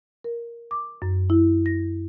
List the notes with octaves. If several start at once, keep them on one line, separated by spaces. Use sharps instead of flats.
A#4
D6
F#2
E4
A#6